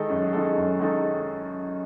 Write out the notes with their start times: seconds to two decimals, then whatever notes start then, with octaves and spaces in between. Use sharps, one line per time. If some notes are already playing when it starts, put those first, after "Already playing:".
Already playing: D#3 G#3 D#4 A4
0.09 F#2
0.33 D#3 G#3 D#4 A4
0.56 F#2
0.80 D#3 G#3 D#4 A4